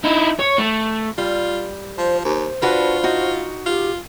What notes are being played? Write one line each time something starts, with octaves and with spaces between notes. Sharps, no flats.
D#4 E4
C#5
A3
G3 F4
F3 C5
D#2 C5
D4 F4 F#4 B4
D#4 F#4
F4 G4